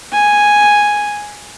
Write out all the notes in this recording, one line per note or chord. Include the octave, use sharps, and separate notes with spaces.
G#5